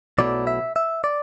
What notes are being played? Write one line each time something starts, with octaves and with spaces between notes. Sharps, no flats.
B1 B2 F#3 A3 E4 D5
E5
E5
D5